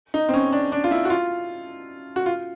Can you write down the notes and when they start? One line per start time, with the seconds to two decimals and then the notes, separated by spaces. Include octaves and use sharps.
0.14 D#4
0.29 C4
0.34 C#4
0.52 D4
0.72 D4
0.84 F4
0.91 E4
1.05 F#4
1.10 F4
2.16 F#4
2.26 F4